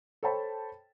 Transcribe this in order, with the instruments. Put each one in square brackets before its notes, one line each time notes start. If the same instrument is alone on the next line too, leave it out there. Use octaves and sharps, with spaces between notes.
[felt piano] A4 C5 C#5 G5 A5 B5